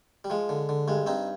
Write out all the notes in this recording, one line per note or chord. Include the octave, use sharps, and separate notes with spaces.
G3
F3 G#3
D3
D3
G2 G#3
G2 C4 D#4